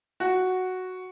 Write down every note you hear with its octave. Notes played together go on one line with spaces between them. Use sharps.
F#4